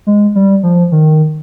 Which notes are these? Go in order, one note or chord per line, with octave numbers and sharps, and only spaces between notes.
G#3
G3
F3
D#3